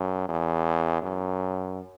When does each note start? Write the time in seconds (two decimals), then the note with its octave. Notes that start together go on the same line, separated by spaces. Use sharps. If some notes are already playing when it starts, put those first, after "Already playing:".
Already playing: F#2
0.29 E2
1.02 F#2